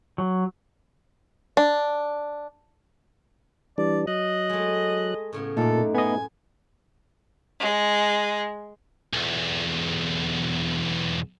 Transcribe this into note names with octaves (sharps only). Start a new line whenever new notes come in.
F#3
D4
E3 G3 D4 D5
F#3 D#5 F#6
G#3 A3
A2 C#3 B3
F#2 A#2 A3 D#4 A4 D5
B3 D#5 G#5
G#3
B1 E2